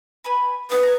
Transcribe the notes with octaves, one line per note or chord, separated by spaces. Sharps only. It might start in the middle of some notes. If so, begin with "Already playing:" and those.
B4 G#5 B5
D#4 G#4 B4
G#5 A#5